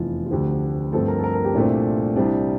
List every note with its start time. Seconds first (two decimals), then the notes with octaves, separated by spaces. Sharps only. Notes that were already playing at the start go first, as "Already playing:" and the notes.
Already playing: F1 E2 E3 F4
0.26 F4
0.31 D2 D3 F3 G4
0.93 G2 F3 A3 C4 A4
1.08 A#4
1.18 A4
1.24 A#4
1.34 A#4
1.44 G4
1.54 C2 A#2 A3 C4 D4
2.16 C2 C3 G3 C4 D4